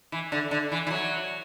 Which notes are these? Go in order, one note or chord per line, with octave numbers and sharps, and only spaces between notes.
E3
D3
D3
E3
E3
F#3